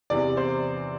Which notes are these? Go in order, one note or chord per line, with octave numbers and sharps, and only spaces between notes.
E2 C3 E3 D5
C5